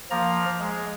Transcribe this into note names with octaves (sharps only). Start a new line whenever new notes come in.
F3 A#3 A#5
G#3